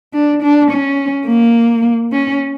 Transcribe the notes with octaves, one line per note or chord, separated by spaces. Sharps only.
D4
D4
C#4
A#3
C#4